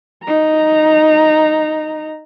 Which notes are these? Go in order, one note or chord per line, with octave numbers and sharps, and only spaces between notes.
D#4 A#5